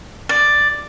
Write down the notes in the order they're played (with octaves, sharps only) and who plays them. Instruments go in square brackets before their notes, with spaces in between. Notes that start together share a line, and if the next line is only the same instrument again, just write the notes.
[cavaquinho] D5